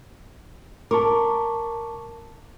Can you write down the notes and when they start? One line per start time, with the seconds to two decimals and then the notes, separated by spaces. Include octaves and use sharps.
0.91 A#4 A5 C#6 D6